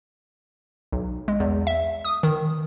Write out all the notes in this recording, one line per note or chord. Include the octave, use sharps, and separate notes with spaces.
B1
G#3
E2
E5
D#6
D#3